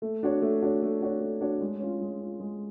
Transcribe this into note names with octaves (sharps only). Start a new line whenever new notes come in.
A3
D4 F#4 C#5
A3
D4 F#4 C#5
A3
D4 F#4 C#5
A3
D4 F#4 C#5
G#3
C#4 F4
G#3
C#4 F4
G#3